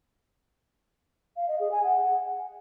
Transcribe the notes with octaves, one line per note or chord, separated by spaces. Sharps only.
F5
D#5
G#4
G#5
F#5